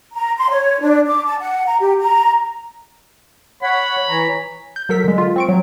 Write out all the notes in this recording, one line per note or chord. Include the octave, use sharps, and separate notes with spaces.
A#5
C6
C#5
D4
D6
A5
F#5
A#5
G4
A#5
C#5 F#5 B5
E3 C#5 A#5
G6
F#3 A4 A#4 B6
D3 G#3
F4
C4 C#6 D7
F#3